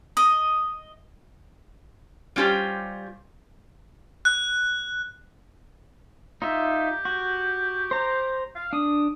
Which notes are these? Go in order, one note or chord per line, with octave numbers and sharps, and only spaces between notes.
D#5 D#6
G3 C#4 F4 G4 C5
F#6
D#4 F4 G4 E5
F#4
C5 A#5
F5
D4 D#6